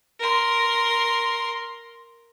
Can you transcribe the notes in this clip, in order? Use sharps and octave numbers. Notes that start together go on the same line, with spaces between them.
A#4 C6